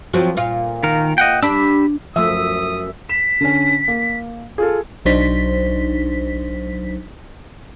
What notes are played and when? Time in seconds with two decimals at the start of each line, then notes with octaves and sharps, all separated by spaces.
0.13 F3 F#3 C4
0.37 A#2 F4
0.83 D#3 A#4
1.18 D#5 F#5 G5
1.43 D4 G4 B5 E6
2.16 F#2 F3 A3 E5 D#6
3.09 B6 E7
3.41 D3 C#4
3.88 A#3
4.58 F4 G#4 A4
5.05 B1 F#3 D4 D#4 C5 B6